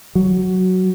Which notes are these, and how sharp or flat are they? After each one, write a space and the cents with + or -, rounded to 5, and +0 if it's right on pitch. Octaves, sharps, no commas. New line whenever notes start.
F#3 +0